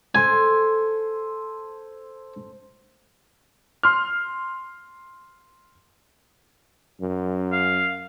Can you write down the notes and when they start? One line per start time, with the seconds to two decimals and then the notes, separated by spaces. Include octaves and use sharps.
0.15 A4 C5 G#5
3.83 C6 F6
7.01 F#2
7.52 F5